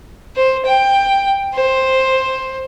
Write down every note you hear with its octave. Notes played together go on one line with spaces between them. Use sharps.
C5
G5
C5